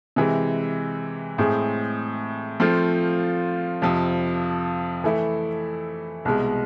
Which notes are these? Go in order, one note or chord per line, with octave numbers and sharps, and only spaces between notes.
C3 E3 G#3
A2 G#3 C4 G#4
F3 A3 C4 F4
F2 C3 F3
E3 A3 E4
C2 B2 G#3